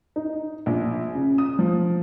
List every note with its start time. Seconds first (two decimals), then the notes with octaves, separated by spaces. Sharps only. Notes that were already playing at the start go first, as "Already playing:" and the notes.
0.16 D#4
0.66 A#1
1.15 C#3
1.38 D#6
1.59 F3